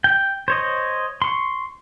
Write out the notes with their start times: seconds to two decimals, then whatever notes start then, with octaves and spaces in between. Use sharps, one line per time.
0.04 G5
0.48 C5 C#5 D#5
1.22 C6 C#6